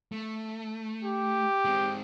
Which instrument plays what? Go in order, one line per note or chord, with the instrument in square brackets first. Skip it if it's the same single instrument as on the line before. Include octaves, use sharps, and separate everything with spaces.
[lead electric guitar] A3
[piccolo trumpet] G4
[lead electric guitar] G#3 C4